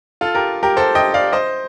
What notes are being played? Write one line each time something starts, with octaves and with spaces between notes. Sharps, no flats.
F4 A4
G4 A#4
G4 A#4
A4 C5
D#5 G5
D5 F5
C5 D#5